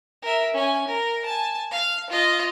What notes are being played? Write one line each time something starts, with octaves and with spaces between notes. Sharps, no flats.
A#4 E5
C#4 G#5
A#4
G#5 A5
F5
F4 D#5